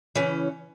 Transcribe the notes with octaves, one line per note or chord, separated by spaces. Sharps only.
C#3 E3 C#4